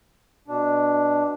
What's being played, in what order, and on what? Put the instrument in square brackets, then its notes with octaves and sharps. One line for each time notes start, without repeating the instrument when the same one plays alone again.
[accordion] B2 D4